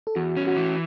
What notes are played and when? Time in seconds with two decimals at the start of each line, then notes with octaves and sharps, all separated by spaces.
0.07 A4
0.16 E2 F#4
0.37 C#4
0.47 F#4
0.57 E3